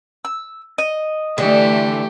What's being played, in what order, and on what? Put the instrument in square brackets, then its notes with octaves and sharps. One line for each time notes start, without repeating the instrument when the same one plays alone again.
[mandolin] E6
D#5
[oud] D3 [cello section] E3 A3 [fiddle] G4